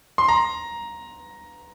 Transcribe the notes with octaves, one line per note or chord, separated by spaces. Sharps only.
C6
A#5